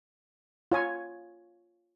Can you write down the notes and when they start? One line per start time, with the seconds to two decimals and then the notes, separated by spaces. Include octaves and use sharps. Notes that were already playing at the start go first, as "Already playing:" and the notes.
0.72 F4 C#5 G#5